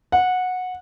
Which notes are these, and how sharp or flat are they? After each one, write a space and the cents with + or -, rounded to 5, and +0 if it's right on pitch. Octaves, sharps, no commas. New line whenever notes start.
F#5 -15